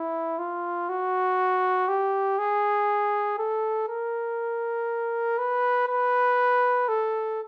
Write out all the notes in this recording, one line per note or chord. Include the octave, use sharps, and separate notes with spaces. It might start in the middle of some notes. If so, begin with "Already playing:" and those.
Already playing: E4
F4
F#4
G4
G#4
A4
A#4
B4
B4
A4